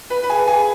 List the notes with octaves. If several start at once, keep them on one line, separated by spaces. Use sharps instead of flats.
B4
B4
G#4
G#4